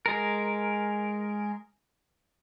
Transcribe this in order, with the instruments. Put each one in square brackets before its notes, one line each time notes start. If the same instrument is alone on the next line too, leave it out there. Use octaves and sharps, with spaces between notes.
[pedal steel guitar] G#3 A#4